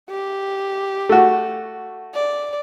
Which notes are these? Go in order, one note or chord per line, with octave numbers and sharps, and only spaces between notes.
G4
A3 F#4
D5